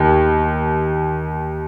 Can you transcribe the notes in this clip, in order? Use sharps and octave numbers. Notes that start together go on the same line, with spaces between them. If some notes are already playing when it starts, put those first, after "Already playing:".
Already playing: D#2